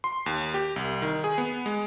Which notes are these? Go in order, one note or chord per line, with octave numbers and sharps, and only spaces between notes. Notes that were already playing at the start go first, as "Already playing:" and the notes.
C6
D#2
G4
C2
D#3
G#4
B3
G#3